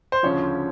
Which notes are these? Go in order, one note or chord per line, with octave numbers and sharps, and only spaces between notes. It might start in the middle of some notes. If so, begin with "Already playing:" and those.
C5
D2 C#3 F3 C#5